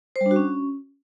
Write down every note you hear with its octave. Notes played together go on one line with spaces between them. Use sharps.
C5
G3
D4
F#4
C#4